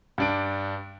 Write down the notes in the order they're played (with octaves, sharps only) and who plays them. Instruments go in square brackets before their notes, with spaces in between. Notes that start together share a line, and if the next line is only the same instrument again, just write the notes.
[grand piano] G2 D4 D7